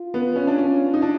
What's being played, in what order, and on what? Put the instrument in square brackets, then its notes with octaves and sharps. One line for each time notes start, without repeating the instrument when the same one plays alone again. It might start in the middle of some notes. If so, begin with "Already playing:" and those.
Already playing: [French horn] F4
[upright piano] B3
C#4
D4
C#4
D#4
D4